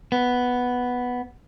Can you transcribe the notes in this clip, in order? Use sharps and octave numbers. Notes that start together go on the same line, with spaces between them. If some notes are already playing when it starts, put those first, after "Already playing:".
B3